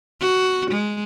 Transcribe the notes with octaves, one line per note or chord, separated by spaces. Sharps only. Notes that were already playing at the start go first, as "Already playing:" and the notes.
F#4
G#3